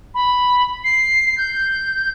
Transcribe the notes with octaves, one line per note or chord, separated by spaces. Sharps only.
B5
C7
G6